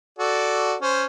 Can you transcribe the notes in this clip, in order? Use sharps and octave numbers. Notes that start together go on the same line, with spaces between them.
F#4 A4 D5
C#4 C5